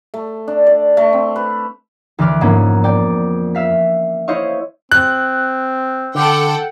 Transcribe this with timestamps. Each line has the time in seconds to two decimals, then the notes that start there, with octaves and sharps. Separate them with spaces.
0.14 A3
0.48 D4
0.66 D5
0.97 A3
1.13 C4
1.36 B4
2.19 D2 E3 B4 D6 F6
2.41 F2 G#2 A#3 B3 C#4 D4
2.84 D5 G5
3.55 E5 F5 B6
4.28 E4 C5 C#5 D#5 F5 C#6
4.92 C4 F#6
6.15 D3 A4 F#5 G5